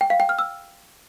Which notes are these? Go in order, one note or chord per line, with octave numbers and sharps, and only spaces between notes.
G5
F5
G5
F6
E6